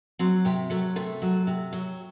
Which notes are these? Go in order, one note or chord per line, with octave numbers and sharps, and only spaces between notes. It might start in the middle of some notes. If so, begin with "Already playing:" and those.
F#3 C4
C3 G4
F#3 A3
C3 A3
F#3
C3
F#3